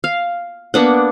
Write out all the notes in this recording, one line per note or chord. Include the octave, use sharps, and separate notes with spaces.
F5
A#3 B3 D4 F#5